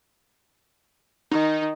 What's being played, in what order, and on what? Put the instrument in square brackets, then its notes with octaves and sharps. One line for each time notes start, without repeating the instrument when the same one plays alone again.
[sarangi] D#3 [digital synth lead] D#4